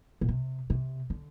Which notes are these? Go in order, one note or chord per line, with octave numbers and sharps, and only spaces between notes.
A#2
C3
C3
D3